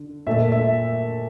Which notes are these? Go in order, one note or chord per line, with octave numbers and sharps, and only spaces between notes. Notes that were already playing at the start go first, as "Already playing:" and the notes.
Already playing: D3
A#2 A3 E5
E5